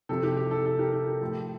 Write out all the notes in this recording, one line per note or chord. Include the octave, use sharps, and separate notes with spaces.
C3 F3 A4
G4
G4
A4
A4
G4 A#4
A4
G4
A2 F3 A4